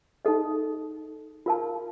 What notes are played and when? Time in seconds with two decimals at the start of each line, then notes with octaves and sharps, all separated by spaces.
0.25 D#4 A4 D#5
1.46 F4 A#4 F5 A5